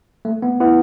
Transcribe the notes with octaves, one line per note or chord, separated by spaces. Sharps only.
A3
B3
B3 E4